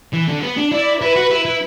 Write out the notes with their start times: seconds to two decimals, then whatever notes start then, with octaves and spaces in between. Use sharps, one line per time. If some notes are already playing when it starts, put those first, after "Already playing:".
0.13 E3
0.28 D3
0.43 B3
0.57 D4
0.72 E4 D5
1.01 E4 B4
1.16 F#4
1.31 E4
1.45 E4